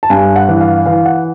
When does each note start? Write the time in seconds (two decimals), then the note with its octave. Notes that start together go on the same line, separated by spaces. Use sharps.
0.03 A5
0.10 G2 G#5
0.36 F#5
0.48 E3
0.60 F5
0.86 E3 F5
1.06 F#5